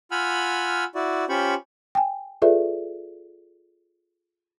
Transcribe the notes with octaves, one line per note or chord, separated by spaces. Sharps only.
F4 F#5 G#5 B5 E6 F6
E4 F#4 D5
C#4 F4 G4 C5 B5 C#6
G5 G#5
F4 G#4 A4 B4 D5 E5